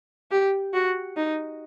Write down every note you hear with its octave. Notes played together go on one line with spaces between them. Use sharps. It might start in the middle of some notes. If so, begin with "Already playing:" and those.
G4
F#4
D#4